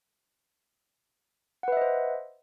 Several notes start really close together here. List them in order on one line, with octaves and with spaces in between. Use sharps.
F#5 B4 E5 D#5 C5